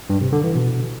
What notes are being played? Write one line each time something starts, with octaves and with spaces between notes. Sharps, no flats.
G2
C3
D3
E3
B2